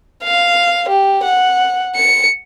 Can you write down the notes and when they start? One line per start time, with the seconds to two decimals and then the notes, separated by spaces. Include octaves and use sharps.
0.24 F5
0.89 G4
1.23 F#5
1.96 C#7